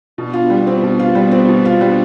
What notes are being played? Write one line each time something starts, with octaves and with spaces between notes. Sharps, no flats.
B2 B3 D4
F4
G3
C4
B2
F4
G3 B3 D4
C4
B2
F4
G3